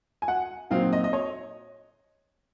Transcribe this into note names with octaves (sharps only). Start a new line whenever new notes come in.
G#5
F#5
A#2 F#3 C4 D#4 F5
D#5
D#5
C#5